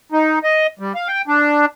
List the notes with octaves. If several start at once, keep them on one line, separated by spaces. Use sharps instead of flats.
D#4
D#5
G3
F5
G5
D4